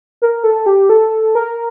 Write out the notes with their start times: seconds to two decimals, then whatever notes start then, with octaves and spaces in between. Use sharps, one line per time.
0.22 A#4
0.44 A4
0.66 G4
0.90 A4
1.35 A#4